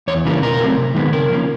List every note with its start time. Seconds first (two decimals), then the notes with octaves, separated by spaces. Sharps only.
0.08 E2 C#5
0.25 C#3 E3 G3 A#3
0.42 B2 A#4
0.60 F#3 A3 C4
0.77 C3
0.95 D#3 G#3 B3
1.12 C#3 A#4
1.30 F3 A#3 C#4